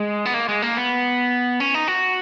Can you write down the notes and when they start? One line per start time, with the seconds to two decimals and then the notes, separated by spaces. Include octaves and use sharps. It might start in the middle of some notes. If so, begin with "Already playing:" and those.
Already playing: G#3
0.25 B3
0.34 A#3
0.49 G#3
0.62 A#3
0.77 B3
1.60 C#4
1.74 D#4
1.88 F#4